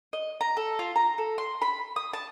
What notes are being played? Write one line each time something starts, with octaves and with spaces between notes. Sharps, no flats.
D#5
A#5
A4
F4
A#5
A4
C6
B5
D#6
A5